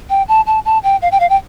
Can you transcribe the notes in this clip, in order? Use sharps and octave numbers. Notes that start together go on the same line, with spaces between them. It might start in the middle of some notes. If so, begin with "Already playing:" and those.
G5
A5
A5
A5
G5
F5
G5
F5
G5